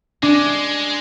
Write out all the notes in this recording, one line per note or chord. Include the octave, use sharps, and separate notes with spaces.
G#3 D4